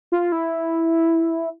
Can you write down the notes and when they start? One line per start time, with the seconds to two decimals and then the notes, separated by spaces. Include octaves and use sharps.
0.12 F4
0.32 E4